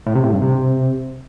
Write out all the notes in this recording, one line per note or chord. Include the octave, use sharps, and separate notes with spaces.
A2
C3
A2
G2
C3